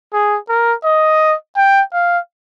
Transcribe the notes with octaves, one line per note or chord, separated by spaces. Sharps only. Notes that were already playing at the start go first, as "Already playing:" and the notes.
G#4
A#4
D#5
G5
F5